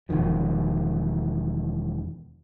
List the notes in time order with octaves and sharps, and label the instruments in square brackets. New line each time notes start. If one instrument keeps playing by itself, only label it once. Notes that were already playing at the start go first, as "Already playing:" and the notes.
[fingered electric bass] E1 A#1 D#3 F3